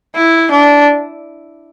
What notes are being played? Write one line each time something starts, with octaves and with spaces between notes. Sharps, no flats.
E4
D4